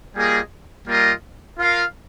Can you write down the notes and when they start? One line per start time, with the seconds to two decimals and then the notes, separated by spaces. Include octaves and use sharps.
0.14 G3 A#3 F4 G#4 D#5
0.88 G3 A#3 F4 A#4 D#5
1.59 F4 A#4 F5